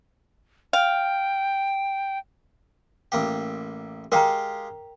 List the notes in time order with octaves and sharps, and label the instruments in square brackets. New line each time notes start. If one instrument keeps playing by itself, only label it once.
[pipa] F5 [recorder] G5
[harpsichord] A1 A#3 G4
[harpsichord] G#3 G4 F5 [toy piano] A#4 G5 A#5